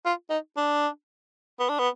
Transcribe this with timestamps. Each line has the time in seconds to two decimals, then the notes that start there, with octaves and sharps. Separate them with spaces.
0.05 F4
0.30 D#4
0.57 D4
1.59 B3
1.69 D4
1.79 B3